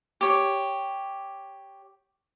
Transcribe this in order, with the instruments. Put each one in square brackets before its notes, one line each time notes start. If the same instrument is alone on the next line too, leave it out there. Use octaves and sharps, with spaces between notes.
[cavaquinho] G4 C#5